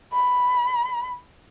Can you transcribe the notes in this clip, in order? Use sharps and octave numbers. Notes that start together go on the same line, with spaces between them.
B5